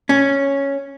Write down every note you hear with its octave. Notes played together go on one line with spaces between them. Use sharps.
C#4